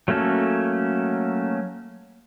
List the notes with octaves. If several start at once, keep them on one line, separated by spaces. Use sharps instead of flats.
F#3 A3 A#3 C#4 A4